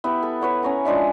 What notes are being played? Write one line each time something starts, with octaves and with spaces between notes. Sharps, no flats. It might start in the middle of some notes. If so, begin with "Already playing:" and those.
B3 E4 G4
A4
A4 B4 C#5 F#5
C#4 C#5 A#5
F3 G#3 D4 E5